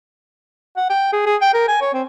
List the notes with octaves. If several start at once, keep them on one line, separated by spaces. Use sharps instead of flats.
F#5
G5
G#4
G#4
G5
A#4
G#5
C#5
C4